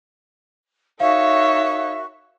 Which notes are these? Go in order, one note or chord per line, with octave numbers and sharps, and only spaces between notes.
D#4 F#4 A#4 C#5 E5 F5 C#6